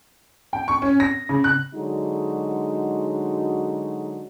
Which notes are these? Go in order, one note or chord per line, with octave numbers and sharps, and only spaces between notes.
G5
C#6
C#4
A#6
C#3
F#6
D3 F#3 G#3 D#4 F#4